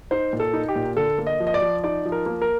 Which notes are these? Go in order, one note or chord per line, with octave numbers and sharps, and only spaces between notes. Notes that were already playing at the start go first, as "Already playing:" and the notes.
D#4 C5
A#2
A4
D#4
G4
A#2
D3 A4
A#3
D#5
F3
D#5
D5
F3
D#4 D5
F3
A#4
A#3
A#4